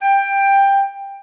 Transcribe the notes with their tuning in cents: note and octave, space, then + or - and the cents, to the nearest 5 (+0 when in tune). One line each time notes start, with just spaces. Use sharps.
G5 +15